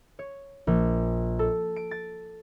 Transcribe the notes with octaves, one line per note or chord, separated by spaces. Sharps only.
C#5
A#1
A4
D7
A6